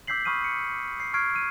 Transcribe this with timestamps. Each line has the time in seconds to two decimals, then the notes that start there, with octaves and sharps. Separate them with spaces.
0.07 D6 E6 G6 B6 C7 F#7
0.25 B5 C#6 D#6 F6 D#7
0.44 C#7
1.00 C7
1.14 C#6 F6 G#6 C7 D7
1.35 F6 D#7